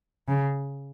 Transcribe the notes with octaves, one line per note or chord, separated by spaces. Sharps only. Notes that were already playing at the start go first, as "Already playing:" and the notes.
C#3